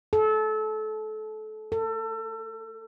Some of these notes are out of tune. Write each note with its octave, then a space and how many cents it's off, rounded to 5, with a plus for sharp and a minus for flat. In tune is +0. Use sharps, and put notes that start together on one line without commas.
A4 -25
A4 +30